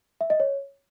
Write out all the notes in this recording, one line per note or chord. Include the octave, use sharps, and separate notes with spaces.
E5
D#5
C#5